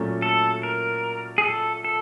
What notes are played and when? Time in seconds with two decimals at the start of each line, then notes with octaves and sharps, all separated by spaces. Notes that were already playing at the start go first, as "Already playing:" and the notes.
Already playing: A#2 F#3 A3 C#4
0.22 A4
0.63 A#4
1.38 G#4
1.44 A4
1.84 A4